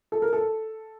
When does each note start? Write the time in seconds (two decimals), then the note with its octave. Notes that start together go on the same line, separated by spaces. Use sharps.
0.12 A4
0.22 A#4
0.33 A4